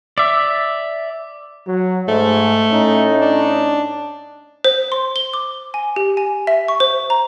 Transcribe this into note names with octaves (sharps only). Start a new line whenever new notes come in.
D5 E5 D6
F#3
G#2 A3
A2 C#4 D#4
D4
C5
C6
G7
D6
G#5
G4
G#5
E5
C#6
C5
A#5